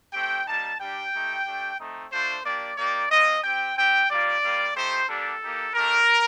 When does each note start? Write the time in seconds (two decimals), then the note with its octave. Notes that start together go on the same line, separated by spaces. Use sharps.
0.13 A3 C4 G4 G5
0.46 G3 A#3 D#4 A5
0.79 G3 D4 G4 G5
1.13 A3 D#4 G4
1.46 A3 D4 G4
1.78 A3 C4 D#4
2.11 A3 D4 F4 C5
2.44 A#3 D4 G4 D5
2.77 A#3 D#4 G4 D5
3.10 C4 F4 D#5
3.43 C4 G4 G5
3.76 C4 G4 G5
4.09 G3 A#3 F4 D5
4.42 G3 A#3 F4
4.75 A3 D#4 G4 C5
5.08 G3 A#3 D4 G4 A4
5.41 A#3 D#4 G4
5.75 A3 D4 G4 A#4